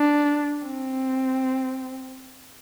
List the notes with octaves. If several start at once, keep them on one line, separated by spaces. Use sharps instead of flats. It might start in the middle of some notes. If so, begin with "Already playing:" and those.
Already playing: D4
C4